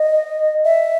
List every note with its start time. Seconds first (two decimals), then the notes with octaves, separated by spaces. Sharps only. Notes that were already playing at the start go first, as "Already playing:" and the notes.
Already playing: D#5
0.64 E5